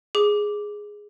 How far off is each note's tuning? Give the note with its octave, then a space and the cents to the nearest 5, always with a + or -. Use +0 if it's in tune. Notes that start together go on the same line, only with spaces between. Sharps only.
G#4 +0 D6 +0